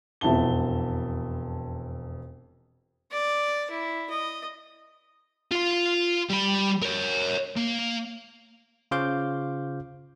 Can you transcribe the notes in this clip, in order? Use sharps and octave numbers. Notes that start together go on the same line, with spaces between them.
E1 F2 E4 A5 G7
D5
E4
D#5
F4 F5
G3 B5
A#4 C#5
A#3
C#3 F4 C5 F5 D6 G6